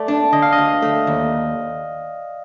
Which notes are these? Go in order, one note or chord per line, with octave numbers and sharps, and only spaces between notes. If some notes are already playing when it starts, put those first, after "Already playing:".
Already playing: A3 D5
D4
D3 D#5
F5
D#5
D2
A3
D#2